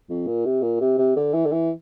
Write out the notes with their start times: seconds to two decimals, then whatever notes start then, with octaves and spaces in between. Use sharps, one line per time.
0.10 F2
0.27 A#2
0.45 C3
0.62 A#2
0.81 C3
0.98 C3
1.16 D3
1.34 E3
1.45 D3
1.52 E3